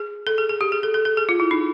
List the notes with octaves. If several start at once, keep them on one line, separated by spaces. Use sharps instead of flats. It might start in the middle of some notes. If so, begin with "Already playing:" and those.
Already playing: G#4
A4
G#4
G#4
G4
G#4
A4
A4
A4
G#4
F4
E4
D#4